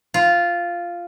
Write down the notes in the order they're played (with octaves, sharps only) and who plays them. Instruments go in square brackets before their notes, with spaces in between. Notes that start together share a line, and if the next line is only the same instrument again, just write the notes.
[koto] F4